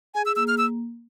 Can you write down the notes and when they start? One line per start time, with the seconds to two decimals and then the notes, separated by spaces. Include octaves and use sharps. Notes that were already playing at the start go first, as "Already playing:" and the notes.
0.15 G#4 G#5
0.26 E6
0.36 A#3 E6
0.48 F6
0.58 E6